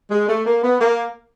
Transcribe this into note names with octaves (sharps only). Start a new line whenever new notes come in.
G#3
A3
A#3
B3
A#3